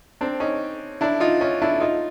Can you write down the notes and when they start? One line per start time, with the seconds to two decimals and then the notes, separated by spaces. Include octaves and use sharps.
0.21 C4 D4
0.40 C#4 D#4
1.01 D4 E4
1.20 D#4 F4
1.41 C#4 D#4
1.62 D4 E4
1.81 D#4 F4